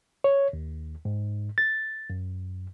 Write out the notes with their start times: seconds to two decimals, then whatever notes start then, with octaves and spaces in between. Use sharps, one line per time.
0.24 C#5
0.53 D#2
1.05 G#2
1.58 A6
2.10 F#2